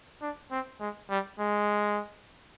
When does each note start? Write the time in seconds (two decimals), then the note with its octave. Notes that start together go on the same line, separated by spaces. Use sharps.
0.22 D4
0.51 C4
0.80 G#3
1.10 G3
1.39 G#3